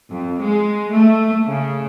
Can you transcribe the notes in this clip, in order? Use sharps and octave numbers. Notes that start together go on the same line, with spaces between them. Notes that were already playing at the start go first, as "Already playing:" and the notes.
F2
G#3
A3
C#3